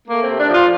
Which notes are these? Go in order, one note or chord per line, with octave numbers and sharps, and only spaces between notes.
A3 A#3
C4
C3
D4
F3
F4